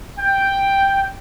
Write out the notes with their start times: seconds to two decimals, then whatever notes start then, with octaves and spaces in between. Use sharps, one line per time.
0.19 G5